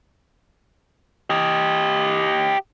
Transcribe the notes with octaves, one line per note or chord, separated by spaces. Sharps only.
G4 D#5